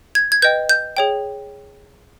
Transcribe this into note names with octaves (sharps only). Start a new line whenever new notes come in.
G#6
G#6
B4 D#5 G5 G6
G6
G#4 C#5 G5